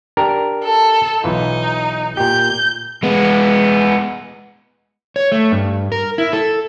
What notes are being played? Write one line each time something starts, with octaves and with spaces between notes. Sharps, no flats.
D4 G4 A#4
A4
B1 E3 D#4 F4
A#2 G4 G6
G#3 B3
C#5
A3
G2
A#4
E4
A4